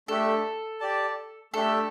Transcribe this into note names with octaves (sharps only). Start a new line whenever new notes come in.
A3 D4 G4 A4 E5
G4 D5 A5
A3 D4 G4 A4 E5